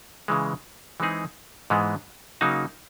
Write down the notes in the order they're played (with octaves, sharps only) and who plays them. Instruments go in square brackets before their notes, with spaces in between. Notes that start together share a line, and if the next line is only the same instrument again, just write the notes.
[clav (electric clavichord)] C#3 E3 G#3
E3 G#3 C4 D#4 G#4
G#2 E3 G#3 B3
C#3 F#3 A#3 D#4 F#4